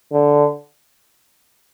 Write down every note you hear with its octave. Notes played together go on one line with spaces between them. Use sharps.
D3